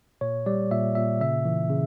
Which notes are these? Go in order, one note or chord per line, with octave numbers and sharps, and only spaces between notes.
A#2 C#5
G3 D5
A#2 E5
A#2 E5
C#3 E5
E3
C#3